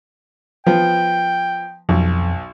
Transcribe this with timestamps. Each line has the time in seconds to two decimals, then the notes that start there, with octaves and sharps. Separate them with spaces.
0.66 F3 B3 G5
1.89 B1 F2